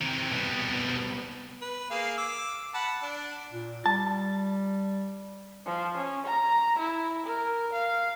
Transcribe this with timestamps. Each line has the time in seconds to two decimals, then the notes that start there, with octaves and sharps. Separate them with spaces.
0.01 C3 D#3 E3
0.31 C2 B2 G3 B3
1.61 B4
1.91 A#3 G#4 F5
2.17 D6 E6
2.74 F#5 A5 B5
3.03 D4
3.52 A#2
3.86 G3 A5
5.66 F3
5.97 C#4
6.26 A#5
6.78 E4
7.26 A#4
7.73 F5